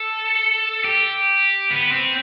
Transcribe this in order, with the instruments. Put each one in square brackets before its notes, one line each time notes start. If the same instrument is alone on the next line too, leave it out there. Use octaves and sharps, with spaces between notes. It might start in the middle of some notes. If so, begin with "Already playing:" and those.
Already playing: [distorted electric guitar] A4
G4
B3
C4